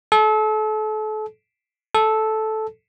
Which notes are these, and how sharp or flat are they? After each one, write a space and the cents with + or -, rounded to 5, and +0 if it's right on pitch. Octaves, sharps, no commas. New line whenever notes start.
A4 -35
A4 -10